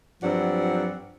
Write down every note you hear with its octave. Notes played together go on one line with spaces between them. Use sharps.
G2 F3 F#3 C4 D5 F#5